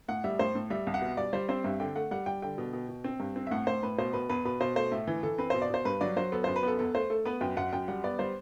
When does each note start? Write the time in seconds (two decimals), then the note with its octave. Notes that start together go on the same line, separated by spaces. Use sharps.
0.08 A2 F#5
0.24 G3 E5
0.39 A2 C5
0.55 A2
0.70 G3 E5
0.87 C2
0.94 F#5
1.01 B2
1.17 G3 D5
1.33 G3 C5
1.49 C4 C5
1.64 G2 E5
1.80 D3 G5
1.96 A3 F#5
2.11 G3 F#5
2.26 G3 G5
2.42 D3 G5
2.58 B2
2.73 B2
2.89 B2
3.04 C4
3.20 G2
3.36 C4
3.47 E5
3.51 A2 F#5
3.67 A2 C5
3.83 A2 B4
3.98 B2 C5
4.13 B2 B4
4.29 E2 B4
4.45 B2 B4
4.61 B2 C5
4.76 A3 C5
4.91 A2 E5
5.07 E3
5.23 E3 A4
5.38 C4 B4
5.50 B2 C5
5.62 D5
5.70 B2 C5
5.85 G2 B4
6.01 F#3 D5
6.16 F#3 C5
6.32 B3 A4
6.44 F#2 C5
6.56 B4
6.63 B3 A4
6.79 E2 A4
6.95 A3 C5
7.10 A3 A4
7.25 B3 B4
7.41 F#2 G5
7.57 F#2 F#5
7.73 F#2 G5
7.88 G3 F#5
8.04 B3 D5
8.19 G3 C5